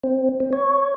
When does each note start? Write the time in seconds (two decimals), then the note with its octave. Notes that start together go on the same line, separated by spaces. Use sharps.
0.03 C4
0.40 C4
0.53 C#5